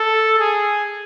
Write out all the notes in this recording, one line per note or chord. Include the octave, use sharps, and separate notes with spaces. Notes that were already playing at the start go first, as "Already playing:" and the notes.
Already playing: A4
G#4